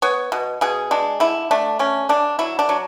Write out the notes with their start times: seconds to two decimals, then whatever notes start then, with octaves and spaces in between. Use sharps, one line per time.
0.02 B3 C#5
0.32 B2
0.61 B2 G#4
0.91 G#3 D4
1.20 D3 E4
1.51 A3 D4
1.79 D3 C#4
2.09 D3 D4
2.39 F#3 E4
2.59 D4
2.69 F#3